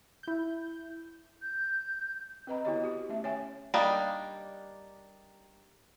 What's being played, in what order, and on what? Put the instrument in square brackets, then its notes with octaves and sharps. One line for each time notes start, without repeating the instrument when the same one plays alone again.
[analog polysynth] E4 G6
[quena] G6
[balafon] C4 B4 D#5 A#5 B5
B3 E4 F#4 G4 C#5 D#5
F#4 G4
A3 C#4 E5
C#5 E5 G5 G#5
[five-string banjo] G3 A#3 D4 D#4